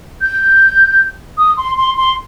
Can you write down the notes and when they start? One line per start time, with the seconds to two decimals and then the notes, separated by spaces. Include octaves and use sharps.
0.21 G6
1.37 D#6
1.57 C6
1.77 C6
1.96 C6